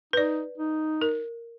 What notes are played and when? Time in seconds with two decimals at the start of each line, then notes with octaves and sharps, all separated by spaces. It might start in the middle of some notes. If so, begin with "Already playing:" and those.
0.13 D#4 B4 D5
0.58 D#4
1.02 A#4